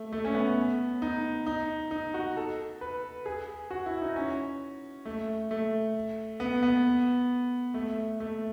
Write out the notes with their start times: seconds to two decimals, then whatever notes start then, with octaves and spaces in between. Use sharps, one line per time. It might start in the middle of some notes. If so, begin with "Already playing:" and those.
Already playing: A3
0.13 A3
0.25 C#4
0.34 B3
1.02 D#4
1.47 D#4
1.91 D#4
2.14 F#4
2.37 A4
2.81 B4
3.26 G#4
3.71 F#4
3.86 E4
4.01 D#4
4.16 C#4
5.05 A3
5.51 A3
6.40 B3
6.63 B3
7.74 A3
8.20 A3